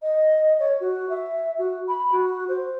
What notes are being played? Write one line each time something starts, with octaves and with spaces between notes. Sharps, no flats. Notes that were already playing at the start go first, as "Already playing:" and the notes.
D#5
C#5
F#4
E5
F#4
B5
F#4
C5